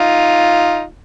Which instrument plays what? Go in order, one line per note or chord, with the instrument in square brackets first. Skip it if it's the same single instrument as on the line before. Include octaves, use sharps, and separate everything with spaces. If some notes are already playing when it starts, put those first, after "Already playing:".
Already playing: [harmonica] D#4 F4